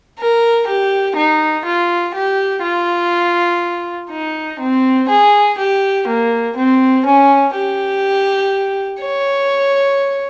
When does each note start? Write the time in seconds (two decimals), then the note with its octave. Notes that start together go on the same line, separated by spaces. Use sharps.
0.19 A#4
0.67 G4
1.16 D#4
1.66 F4
2.15 G4
2.63 F4
4.10 D#4
4.59 C4
5.09 G#4
5.58 G4
6.07 A#3
6.56 C4
7.06 C#4
7.54 G4
9.02 C#5